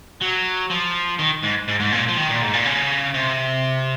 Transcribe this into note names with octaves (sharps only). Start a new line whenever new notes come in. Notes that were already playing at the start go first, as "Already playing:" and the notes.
F#3
F3
D#3
G#2
G#2
G#2
A#2
F3
D#3
A#2
G#2
A#2
C#3
C3